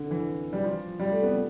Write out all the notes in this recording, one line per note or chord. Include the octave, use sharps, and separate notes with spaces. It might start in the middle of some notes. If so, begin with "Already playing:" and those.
Already playing: D3
E3
G3
F3
G3
A3
B3